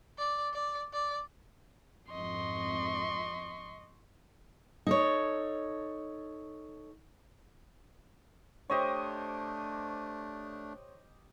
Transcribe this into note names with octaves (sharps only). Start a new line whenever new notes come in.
D5
D5
D5
F2 G#2 C4 D#5 C6 C#6
D#4 A4 C#5
A3 D4 G4 C5 C#5 D#5 C#6